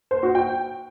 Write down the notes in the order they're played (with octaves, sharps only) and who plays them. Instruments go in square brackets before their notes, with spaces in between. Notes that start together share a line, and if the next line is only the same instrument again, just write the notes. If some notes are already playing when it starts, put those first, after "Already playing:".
[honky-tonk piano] C5
F#4
G5